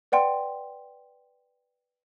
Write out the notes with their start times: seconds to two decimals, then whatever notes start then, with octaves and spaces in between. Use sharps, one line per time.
0.12 B4 D5 F#5 G5 C6